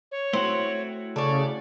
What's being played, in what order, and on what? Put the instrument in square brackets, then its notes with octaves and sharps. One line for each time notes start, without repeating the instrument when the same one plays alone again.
[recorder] C#5
[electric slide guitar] A3 E4 F#4 [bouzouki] C4
[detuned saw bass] C#3 [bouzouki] A4 C#5 [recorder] D5